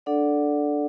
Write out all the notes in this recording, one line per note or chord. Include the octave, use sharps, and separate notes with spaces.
D4 A4 D5 F#5